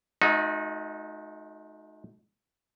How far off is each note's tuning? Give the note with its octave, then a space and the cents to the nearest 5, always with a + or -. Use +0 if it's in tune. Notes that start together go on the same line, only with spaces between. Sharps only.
A3 -45 D#4 +0 F#4 -30